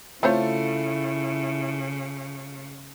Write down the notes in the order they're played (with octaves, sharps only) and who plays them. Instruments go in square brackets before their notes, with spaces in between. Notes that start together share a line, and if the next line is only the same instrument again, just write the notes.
[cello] C#3 [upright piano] A3 F4 A4 [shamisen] C4 C5 C#5 [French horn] E4